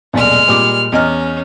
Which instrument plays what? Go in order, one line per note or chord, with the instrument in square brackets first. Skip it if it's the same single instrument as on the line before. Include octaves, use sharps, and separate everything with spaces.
[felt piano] D#1 B1 D5 [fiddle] G#3 F6
[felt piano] A#2 G3 D6
[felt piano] E2 D#5 F6 [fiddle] C#4